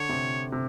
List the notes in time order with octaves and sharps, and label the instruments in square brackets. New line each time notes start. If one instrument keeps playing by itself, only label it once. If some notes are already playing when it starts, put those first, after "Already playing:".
Already playing: [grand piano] D3 [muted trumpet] C#5
[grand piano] C3
C3